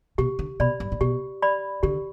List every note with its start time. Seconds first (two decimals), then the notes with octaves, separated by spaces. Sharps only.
0.18 B2 G4
0.39 D3
0.60 B2 D5 B5
0.80 G2
0.92 A2
1.01 B2 G4
1.42 D5 B5
1.83 D3 G4